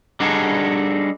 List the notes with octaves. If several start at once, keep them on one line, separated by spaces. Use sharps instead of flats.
G3 D4 D#4 F#4 G#4 A4